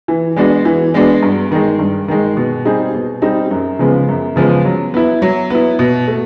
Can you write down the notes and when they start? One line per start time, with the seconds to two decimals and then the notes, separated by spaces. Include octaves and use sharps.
0.08 E3
0.36 G#3 B3 D4 F#4
0.65 E3
0.94 G#3 B3 D4 F#4
1.23 G2
1.52 D#3 G#3
1.79 G2
2.08 D#3 G#3
2.37 B2
2.65 G3 C4 D#4 G#4
2.94 B2
3.22 G3 C4 D#4 G#4
3.51 F#2
3.79 C#3 F3 G#3 B3
4.08 F#2
4.36 C#3 F3 G#3 B3
4.65 F#3
4.94 B3 E4
5.22 F#3
5.50 B3 E4
5.79 B2
6.08 A3